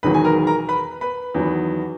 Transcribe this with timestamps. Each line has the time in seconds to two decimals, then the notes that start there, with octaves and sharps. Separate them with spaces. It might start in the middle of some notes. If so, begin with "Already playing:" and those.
0.03 E1 E2 D#3 F#3 B4 B5
0.14 G#5
0.25 A#4 A#5
0.47 A#4 A#5
0.69 B4 B5
1.01 B4 B5
1.34 E2 D#3 F#3